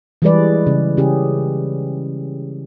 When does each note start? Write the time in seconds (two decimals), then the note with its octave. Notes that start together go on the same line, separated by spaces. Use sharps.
0.22 E3 G3 G#3 G#4 B4 D5
0.67 C#3
0.97 C#3 C#4 G4 G#4